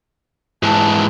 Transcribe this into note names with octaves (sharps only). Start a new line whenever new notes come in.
G#2 E3 A5